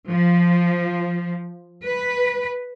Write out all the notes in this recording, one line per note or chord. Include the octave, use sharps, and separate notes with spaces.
F3
B4